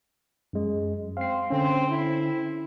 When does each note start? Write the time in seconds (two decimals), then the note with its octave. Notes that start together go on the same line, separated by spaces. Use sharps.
0.53 F#2 G#3
1.17 C4 F5 C7
1.50 D3 C4 C#4
1.89 E4